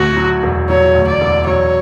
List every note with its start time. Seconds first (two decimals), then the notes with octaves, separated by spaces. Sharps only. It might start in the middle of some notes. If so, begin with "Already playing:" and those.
Already playing: D2 F#4
0.17 F#3
0.43 E1
0.69 F#3 C#5
0.95 D2
1.07 D5
1.21 E1
1.47 F#3 C#5